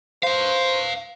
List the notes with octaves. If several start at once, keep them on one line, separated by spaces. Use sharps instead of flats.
B4 C5 F5